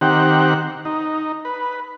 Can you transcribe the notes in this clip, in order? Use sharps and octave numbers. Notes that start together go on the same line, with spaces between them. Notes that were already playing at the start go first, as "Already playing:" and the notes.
D#3 C4 G4 F#5
D#4
B4